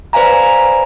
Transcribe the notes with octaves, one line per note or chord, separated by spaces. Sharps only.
B4 C5 D5 F5 G#5 A#5